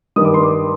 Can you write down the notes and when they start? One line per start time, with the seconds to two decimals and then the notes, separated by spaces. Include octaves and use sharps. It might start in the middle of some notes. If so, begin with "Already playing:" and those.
0.16 G2 D#3 G3 D#6
0.25 D6
0.34 C6
0.43 D6